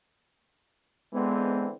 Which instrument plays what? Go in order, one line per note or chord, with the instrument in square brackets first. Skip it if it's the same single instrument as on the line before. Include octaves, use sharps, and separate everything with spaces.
[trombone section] D3 E3 C4 [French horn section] G#3 B3